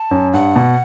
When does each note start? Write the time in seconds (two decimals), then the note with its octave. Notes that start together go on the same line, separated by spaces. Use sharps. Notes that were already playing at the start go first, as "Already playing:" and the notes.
Already playing: A5
0.11 F#2
0.33 G2 F#5
0.56 B2